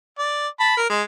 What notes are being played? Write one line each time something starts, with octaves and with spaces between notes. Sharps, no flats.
D5
A5 B5
A#4
G#3